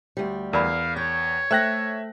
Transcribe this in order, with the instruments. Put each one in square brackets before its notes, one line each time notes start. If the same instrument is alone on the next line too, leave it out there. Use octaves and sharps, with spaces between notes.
[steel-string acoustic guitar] D2 G3
[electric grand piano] E2 [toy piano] A#4 D5 B5 [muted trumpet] F5
[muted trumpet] C#5 [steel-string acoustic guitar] G5
[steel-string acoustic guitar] A3 [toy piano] A4 C5 G5 [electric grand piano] E5 F#6 A#6